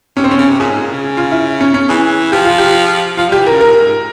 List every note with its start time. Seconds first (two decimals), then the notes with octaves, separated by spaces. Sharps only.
0.17 C3 C#4
0.24 C4
0.27 C#3
0.31 C#4
0.38 C#3
0.49 C3
0.60 A#2 G#4
0.70 G#2
0.81 A#2
0.92 C#3
1.17 F4
1.32 E4
1.61 C#4
1.74 C#4
1.89 E3 G#4
2.32 F3 G4
2.45 F4
2.58 G4
3.17 F3 F4
3.29 G3 G4
3.39 E3
3.46 C#3 A#4
3.61 G#2 A#4
3.71 A#2
3.82 G#2